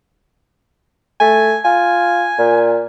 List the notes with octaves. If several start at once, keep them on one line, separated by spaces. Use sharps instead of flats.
A3 G#5
F4 G#5
A#2